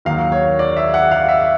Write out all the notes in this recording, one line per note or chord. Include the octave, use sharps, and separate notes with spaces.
D#2 D#3 F#3 F5
C#5
D5
E5
F#5
F5
E5